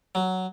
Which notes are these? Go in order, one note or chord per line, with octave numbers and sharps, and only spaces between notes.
F#3